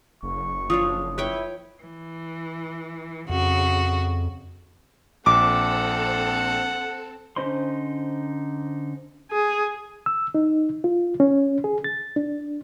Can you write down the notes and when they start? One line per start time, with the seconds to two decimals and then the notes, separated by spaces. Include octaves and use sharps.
0.23 F#1 C#6
0.70 F3 D4 C#5 D#6
1.18 E4 B4 C#5 G5
1.82 E3
3.29 F2 C#3 F#4
5.26 A#1 C4 A4 F#5 D6
7.36 D3 C#4 D#4 C5 C6
9.31 G#4
10.06 E6
10.35 D#4
10.84 F4
11.20 C#4
11.64 G#4
11.84 A6
12.16 D4